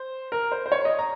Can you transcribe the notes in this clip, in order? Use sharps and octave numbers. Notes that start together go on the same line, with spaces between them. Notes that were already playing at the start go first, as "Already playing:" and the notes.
Already playing: C5
A#4
C5
C5
C#5
D#5
A#5